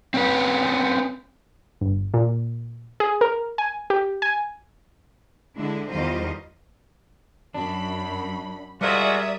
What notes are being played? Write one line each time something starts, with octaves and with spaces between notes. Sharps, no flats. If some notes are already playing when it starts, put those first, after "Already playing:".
C4 C#4 B4
G1
A#2
G#4
A#4
G#5
G4
G#5
D3 G#3 D4 E4
E2 D#3 G3 F4 C5 D#5
F#2 D4 B5
G3 G#3 F4 F#4 A#4 D5 E5 D#6